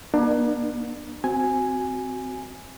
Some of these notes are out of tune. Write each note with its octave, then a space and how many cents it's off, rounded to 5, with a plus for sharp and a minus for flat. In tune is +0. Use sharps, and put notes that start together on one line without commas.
A#3 +45 D4 +30
C4 -10 F#4 +0 G#5 +0